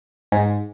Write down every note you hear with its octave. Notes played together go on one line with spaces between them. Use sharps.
G#2